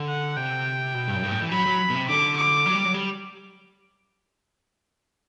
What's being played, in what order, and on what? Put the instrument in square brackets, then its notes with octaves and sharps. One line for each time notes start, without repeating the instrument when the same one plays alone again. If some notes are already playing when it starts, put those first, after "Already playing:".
Already playing: [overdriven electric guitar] D3
[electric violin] F#5
[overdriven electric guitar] C3 [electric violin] G5
[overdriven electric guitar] B2
G2
F#2
G2
A2
E3
[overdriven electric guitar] F#3 [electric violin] B5
[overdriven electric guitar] F#3
B2
C3
[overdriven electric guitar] D3 [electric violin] D6
[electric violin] D6
[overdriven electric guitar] F#3
G3
F#3
G3